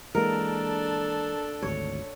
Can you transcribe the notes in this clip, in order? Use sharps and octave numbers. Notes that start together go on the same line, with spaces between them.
E3 G#3 A#3 D4 A4 A#4
G#1 D2 C#5